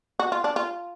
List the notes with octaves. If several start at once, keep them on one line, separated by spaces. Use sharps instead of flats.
F#4
F4
D4
F4